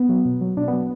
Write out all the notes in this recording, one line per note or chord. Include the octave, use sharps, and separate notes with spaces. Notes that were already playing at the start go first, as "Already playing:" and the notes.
Already playing: B3
F#3
B2
F#3
B2 D4
B3
F#3